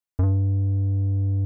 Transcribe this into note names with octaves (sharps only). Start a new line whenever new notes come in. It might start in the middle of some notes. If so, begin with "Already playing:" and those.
F#2
G2